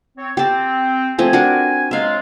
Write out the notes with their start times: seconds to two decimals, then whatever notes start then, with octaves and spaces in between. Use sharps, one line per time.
0.17 C4 C#5
0.37 C4 G4 A5
1.18 F3 A3 C4 G#5
1.33 D4 F#4 A#4
1.91 F#3 G#3 F4 E5 F5